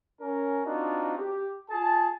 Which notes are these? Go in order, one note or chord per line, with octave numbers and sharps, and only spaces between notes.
C#4 A#4
C4 D4 D#4 F4 F#4
G4
F4 G#4 A5